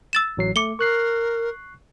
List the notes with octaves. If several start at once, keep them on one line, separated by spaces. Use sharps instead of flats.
E6 A6 E7
A1 F#3 C7
A3 D6 C#7 G7
A#4 C#6 F#6 C7